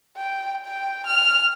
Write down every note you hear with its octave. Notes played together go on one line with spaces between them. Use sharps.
G5
G5
F6